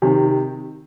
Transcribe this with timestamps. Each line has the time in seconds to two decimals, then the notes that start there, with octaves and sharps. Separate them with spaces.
0.02 C3 D#3